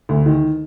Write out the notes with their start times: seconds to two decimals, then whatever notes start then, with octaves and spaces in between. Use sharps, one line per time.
0.09 D2
0.26 D#3